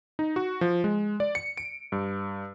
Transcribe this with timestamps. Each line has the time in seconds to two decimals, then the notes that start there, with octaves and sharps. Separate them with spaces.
0.19 D#4
0.36 F#4
0.61 F3
0.84 G#3
1.20 D5
1.35 C#7
1.57 D7
1.92 G2